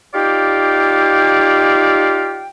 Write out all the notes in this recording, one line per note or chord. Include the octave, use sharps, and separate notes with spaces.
D#4 F4 G4 D5 F5 G5